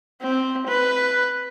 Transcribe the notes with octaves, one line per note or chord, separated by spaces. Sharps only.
C4
B4